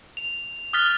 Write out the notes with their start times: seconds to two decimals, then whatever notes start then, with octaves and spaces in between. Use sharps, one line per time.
0.17 F7
0.73 D#6 F6 F#6 A6 B6 G7